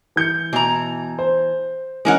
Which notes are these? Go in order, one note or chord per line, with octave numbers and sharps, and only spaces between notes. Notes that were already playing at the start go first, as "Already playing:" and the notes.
E3 G6 C#7
B2 E3 A#5
C5
E3 G#3 C#4 D#4 A#4 F#5